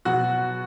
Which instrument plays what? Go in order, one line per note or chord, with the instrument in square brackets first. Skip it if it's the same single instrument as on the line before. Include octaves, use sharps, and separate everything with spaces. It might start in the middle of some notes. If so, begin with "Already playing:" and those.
[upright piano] B2 F#3 B3 F#4 F#5